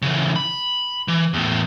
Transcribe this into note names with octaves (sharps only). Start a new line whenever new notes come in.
C#3 E3
B5
E3
E2 A2